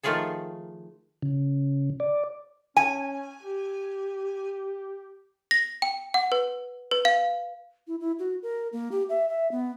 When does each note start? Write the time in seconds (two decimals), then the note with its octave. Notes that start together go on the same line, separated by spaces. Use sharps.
0.03 D#3 F3 A3 F4 G#4 A4
1.22 C#3
2.00 D5
2.77 C#4 G#5
3.43 G4
5.51 A#6
5.82 G5
6.14 F#5
6.32 B4
6.91 B4
7.05 F5
7.87 E4
8.00 E4
8.19 F#4
8.43 A#4
8.73 A#3
8.92 G4
9.09 E5
9.29 E5
9.52 B3